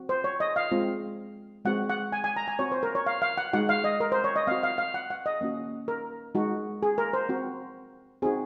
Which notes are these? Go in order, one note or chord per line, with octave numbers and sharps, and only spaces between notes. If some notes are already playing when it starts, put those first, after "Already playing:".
Already playing: C4 F#4
C5
C#5
D#5
F5
G#3 C4 F4
G#3 C4 F#4 F#5
F#5
G#5
G#5
A#5
G#5
C4 F#4 C#5
C5
A#4
C#5
F5
F5
F#5
G#3 D#4 F#4 F#5
F5
D#5
A#4
C5
C#5
D#5
C4 F#4 F5
F5
F5
F#5
F#5
D#5
A#3 C#4 F#4
A#4
G#3 D#4 F#4
G#4
A#4
C5
C4 F#4
C4 D#4 F#4 G#4